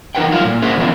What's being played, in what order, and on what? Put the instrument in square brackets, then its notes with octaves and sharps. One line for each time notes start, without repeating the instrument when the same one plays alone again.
[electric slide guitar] E3 D#4 A#4 B4 F#5 G5
F3 G3 A3 F4 F5
A#2
C#4 G#4 A#4 C5 E5 F#5
D#3 F3 B3 E4 F4 A#4